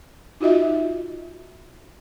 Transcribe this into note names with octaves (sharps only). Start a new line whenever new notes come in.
D#4 F4 F#4 D#5 E5